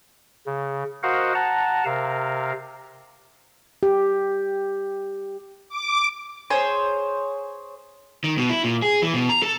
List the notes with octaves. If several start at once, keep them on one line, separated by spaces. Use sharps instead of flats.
C#3
F#4 A#4 C5 D#5 F5 F#5
F#5 A5 A#5
C3 A#4 F5
G4
D6
G#4 C5 C#5
D#3
B2
E4
A#2
G#4
E3
B2
A#5
A4